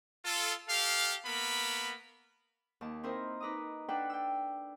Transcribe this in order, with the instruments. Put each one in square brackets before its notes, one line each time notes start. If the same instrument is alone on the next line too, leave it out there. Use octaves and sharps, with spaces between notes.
[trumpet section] F4 A4
G4 A4 F5
A#3 B3 A#4 B5
[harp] D#2 A5
C4 D#4 E4 A#4 C5
D#4 B4 A#5 D6 D#6
D4 A4 B4 F#5 G5
G5 E6